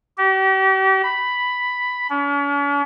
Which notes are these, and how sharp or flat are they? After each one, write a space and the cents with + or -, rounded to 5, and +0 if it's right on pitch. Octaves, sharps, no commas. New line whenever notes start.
G4 -40
B5 +5
C#4 +45